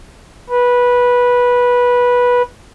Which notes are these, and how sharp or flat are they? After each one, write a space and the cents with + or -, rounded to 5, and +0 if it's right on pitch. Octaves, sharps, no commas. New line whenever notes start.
B4 -15